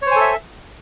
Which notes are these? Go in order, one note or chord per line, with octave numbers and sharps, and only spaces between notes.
A4 C5 C#5 E5 G#5